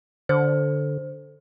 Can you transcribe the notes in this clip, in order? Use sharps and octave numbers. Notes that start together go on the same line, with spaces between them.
D3 C5